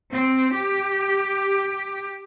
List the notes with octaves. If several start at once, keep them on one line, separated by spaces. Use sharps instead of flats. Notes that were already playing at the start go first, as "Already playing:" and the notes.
C4
G4